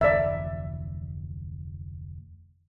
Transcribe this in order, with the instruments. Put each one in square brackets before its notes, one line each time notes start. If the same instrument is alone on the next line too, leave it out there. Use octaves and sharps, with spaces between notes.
[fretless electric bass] F1 D2 E3 [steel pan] D5 E5